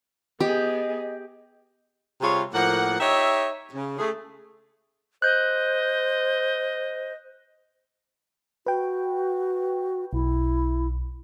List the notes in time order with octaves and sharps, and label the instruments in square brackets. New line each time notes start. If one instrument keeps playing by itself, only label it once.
[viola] B3 G#4 [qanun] G4 [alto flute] D#5
[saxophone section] C3 G3 F4 G#4 B4 C#5
A2 F3 A#3 A#4 F#5
D#4 G4 C#5 D#5 E5
C#3
A3 G#4
[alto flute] C5 [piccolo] D#5 [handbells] F#6 G6
[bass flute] F#4 [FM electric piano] B4 G5
[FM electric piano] B1 [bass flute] E4